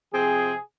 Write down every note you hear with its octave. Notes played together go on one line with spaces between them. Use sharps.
C3 F3 C4 G#4